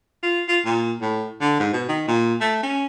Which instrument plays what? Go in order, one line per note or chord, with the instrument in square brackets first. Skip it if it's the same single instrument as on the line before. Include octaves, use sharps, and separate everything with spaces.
[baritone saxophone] F4
F4
A#2
A2
D3
G#2
B2
D#3
A#2
A3
C#4